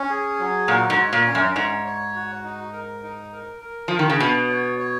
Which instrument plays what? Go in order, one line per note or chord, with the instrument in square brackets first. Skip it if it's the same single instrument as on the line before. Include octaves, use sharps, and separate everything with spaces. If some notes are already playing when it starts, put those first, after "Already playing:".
Already playing: [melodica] C#4
G#4
F#3
[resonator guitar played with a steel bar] A#2 [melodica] F#4
[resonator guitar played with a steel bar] G#2
[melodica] C#5
[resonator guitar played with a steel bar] A#2
[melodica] C#4
[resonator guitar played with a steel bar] F#2
[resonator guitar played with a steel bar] G#2 [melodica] C#5
[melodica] C#5
F#4
D#4
A#4
D#4
A#4
A#4
[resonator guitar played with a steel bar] F3 [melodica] F5
[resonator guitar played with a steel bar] D#3
C#3
[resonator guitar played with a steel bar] B2 [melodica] B3
[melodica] C#5
C#5